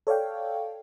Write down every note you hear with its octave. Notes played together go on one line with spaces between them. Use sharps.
A4 C#5 D5 F5 G5